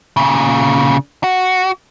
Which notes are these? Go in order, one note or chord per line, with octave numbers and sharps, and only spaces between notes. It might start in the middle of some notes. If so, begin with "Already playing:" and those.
A#2 C#3
F#4